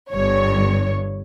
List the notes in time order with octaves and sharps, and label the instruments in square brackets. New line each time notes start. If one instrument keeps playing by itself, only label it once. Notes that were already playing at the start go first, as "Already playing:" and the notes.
[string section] G1 G2 C#5